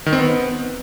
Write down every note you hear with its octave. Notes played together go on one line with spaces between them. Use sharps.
D#3
C4
B3